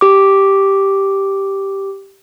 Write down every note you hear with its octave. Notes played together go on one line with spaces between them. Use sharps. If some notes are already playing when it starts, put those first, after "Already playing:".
G4 D6